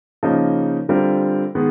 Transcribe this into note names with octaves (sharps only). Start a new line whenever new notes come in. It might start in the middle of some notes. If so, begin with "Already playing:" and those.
C#3 F3 A#3 D#4
D3 G3 C4 F4 A#4
D#3 G#3 B3